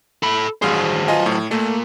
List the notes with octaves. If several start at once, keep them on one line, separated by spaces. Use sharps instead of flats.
A4 B5
A1 G2 F#3 G#4 C5
F4 D#5 G#5
A2
A#2 A3